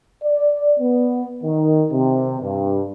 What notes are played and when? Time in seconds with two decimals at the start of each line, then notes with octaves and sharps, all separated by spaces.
0.24 D5
0.80 B3
1.43 D#3
1.92 C3
2.41 G2